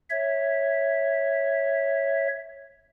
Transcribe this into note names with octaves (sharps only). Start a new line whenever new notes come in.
C#5 E5